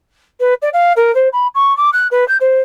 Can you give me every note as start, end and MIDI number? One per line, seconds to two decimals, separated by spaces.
0.40 0.54 71
0.62 0.69 74
0.73 0.93 77
0.96 1.14 70
1.15 1.28 72
1.33 1.47 83
1.55 1.76 85
1.77 1.90 86
1.93 2.08 90
2.11 2.27 71
2.28 2.37 91
2.41 2.61 72